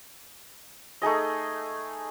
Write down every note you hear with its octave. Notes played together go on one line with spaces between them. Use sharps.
A3 D#4 G#4 D#5